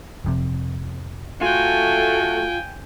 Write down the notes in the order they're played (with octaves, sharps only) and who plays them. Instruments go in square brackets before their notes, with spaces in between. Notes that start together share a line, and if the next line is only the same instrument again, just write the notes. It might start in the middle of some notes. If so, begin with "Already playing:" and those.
[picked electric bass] F1 F2 C3
[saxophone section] A3 F#4 [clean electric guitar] F4 [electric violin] G5 G#5